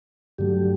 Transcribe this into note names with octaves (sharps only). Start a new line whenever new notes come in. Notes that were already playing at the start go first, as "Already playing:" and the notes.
G2 D3 F#3 A3 G4